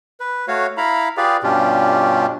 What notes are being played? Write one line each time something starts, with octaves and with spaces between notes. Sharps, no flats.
B4
A3 F#4 C#5 F5
E4 F5 A#5 B5
F4 G4 G#4 B4 D5 F5
G2 B2 C#4 D4 F4 G4